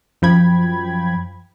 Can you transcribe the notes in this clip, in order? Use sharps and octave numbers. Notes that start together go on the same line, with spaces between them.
F#2 F3 G5 B5 G#6